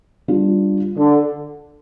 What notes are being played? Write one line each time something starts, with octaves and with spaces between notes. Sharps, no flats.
G3 D4 F4
D3